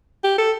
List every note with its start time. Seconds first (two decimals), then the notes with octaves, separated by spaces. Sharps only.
0.24 G4
0.38 A4